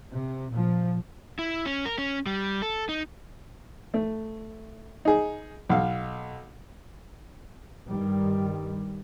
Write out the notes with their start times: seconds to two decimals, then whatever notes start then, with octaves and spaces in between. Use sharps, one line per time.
0.11 C3
0.52 A#2 F3
1.39 E4
1.66 C#4
1.85 A#4
1.98 C#4
2.26 G3
2.62 A4
2.89 D#4
3.94 A3
5.05 D#4 G#4
5.69 B1 F5
7.86 G2 D#3 G3